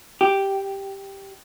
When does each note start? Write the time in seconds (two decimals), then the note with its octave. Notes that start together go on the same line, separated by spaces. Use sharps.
0.21 G4